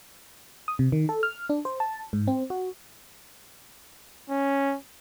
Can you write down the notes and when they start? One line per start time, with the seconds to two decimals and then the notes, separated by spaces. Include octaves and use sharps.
0.68 D#6
0.79 C3
0.92 D#3
1.09 A4
1.23 F6
1.49 D4
1.65 C5
1.80 A5
2.13 G#2
2.28 C4
2.50 F#4
4.30 C#4